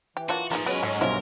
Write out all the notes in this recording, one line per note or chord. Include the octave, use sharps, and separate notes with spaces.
E3 G4
F#3 A#3 D4 F4 F#4
A#2 F3 D#4 G#4 A#4
F#3 G#3 B3 C#4 A#4 B4
G#2 A3
B1 G2 F3 A#4 C5 E5